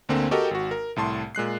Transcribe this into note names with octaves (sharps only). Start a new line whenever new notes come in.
D2 D3 A#3 C4
F#4 G4 A4 A#4 D#5 G5
G#1 F#4
A#4
C2 A2 A5 C6
A#2 G#3 F#6 C7